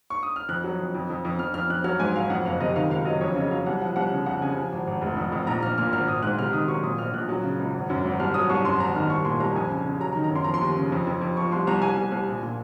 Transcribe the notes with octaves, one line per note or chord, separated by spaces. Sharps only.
C#6
D#6
F6
F2 F#6
F#3
F2
F2
F2
F2
F2 F6
F2 F6
F2 F#6
F#3 F6
G#2 G#5
F#3 F5
F2 F#5
F#1 F5
C3 D#5
D#3 F5
C#2 F5
F#3 D#5
F2 C#5
C#3 D#5
F#3 F5
C2 F#5
F3 F#5
C2 F#5
C#3
F2 F#5
C#3 G#5
F3
G#1
G#1
F1
F2
F2
A#1 A#5
A#1 F6
A#2 F6
G#1 F6
G#1 D#6
G#2 F#6
C3 F6
D#3 D#6
F#3 C#6
A#2 D#6
A#1 F6
A#1 F#6
F#3
C#3
C#2
G#1
F#2
G#1
C2 F6
F#3 D#6
C2 C#6
F#2 C6
G#1 A#5
D#3 F6
C2 C#6
A#2 C6
C2 A#5
F2 G#5
C#3
C#3
F#3 A#5
A#5
D#3
A#5
F#2 C6
F3 A#5
C6
D#2
C#3
F2
F2
F2
F3 C#6
C2 C6
C2 A#5
C2 G#5
C2
C2
A#1
A#2